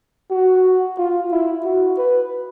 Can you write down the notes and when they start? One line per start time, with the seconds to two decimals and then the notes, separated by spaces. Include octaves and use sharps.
0.30 F#4
0.98 F4
1.32 E4
1.64 F#4
1.98 B4